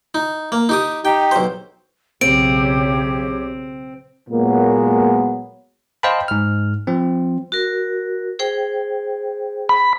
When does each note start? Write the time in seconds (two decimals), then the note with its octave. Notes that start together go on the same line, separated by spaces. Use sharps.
0.15 D#4
0.52 A#3
0.69 D#4 G4 D#6
1.05 D#4 G4 G5
1.31 B1 C5
2.21 B1 C#3 C4 G4 C#5 D7
4.30 A#2 F#3 G#3 A#3 B3
6.03 C5 D#5 F5 G5 A5 B5
6.28 G#2 F6
6.87 F3 C4
7.52 F#4 A#4
8.39 G#4 C5 G5
9.69 B5